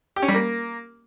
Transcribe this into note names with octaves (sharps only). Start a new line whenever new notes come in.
G4
C#4
G3
A#3